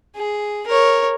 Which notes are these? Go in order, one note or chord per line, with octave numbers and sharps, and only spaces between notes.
G#4
A#4 C#5